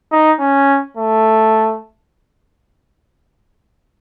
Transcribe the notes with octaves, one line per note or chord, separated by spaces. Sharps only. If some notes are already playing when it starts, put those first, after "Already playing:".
D#4
C#4
A3